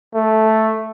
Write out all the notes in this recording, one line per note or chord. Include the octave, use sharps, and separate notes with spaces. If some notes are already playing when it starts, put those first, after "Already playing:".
A3